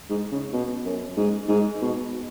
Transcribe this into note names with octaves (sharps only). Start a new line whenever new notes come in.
G#2
C#3
B2
F#2
G#2
G#2
B2